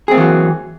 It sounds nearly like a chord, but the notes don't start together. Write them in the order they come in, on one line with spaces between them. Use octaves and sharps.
G#4 C4 A#3 E3 F#3